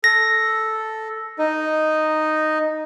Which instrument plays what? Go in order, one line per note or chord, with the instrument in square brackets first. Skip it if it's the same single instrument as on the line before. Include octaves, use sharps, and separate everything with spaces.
[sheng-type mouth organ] A4 [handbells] A#6
[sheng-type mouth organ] D#4 D#5